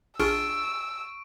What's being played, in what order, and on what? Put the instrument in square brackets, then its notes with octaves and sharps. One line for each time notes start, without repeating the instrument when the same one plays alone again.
[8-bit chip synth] A#1 D4 F4 [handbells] G#4 F6 [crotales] C#6 D7 [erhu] E6